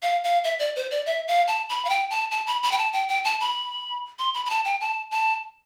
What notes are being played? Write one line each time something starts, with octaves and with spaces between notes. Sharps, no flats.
F5
F5
E5
D5
C5
D5
E5
F5
A5
B5
F5
G5
A5
A5
B5
B5
G5
A5
G5
G5
A5
B5
C6
B5
B5
A5
G5
A5
A5